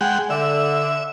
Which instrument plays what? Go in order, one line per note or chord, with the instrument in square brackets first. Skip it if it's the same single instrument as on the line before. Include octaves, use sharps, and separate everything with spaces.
[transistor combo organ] G#3 F#5 G5
[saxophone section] D3 [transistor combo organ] E5